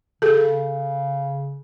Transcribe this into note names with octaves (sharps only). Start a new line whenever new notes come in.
C#3 G#4 A4